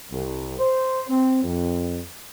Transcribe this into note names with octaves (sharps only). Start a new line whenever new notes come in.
C2
C5
C4
F2